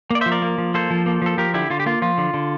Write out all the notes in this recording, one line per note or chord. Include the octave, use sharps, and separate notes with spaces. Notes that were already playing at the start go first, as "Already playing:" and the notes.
A#3 D5
F3 C5 E5
A#4 D5
A#3
F3
A#3 A4 C5
F3
A#3
F3 A4
F3 G4 A#4
D3 E4 G4
D3 F4
G4
A#3 F4
F3 F4
D3
D3